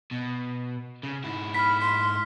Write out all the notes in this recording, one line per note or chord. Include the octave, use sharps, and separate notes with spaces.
B2
C#3
G#2 E4
B5 F6 B6
C6